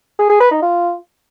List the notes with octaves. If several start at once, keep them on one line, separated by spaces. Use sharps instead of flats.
G#4
G#4
B4
D#4
F4